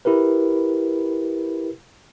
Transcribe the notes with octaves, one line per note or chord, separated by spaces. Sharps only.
E4 G4 A#4 B4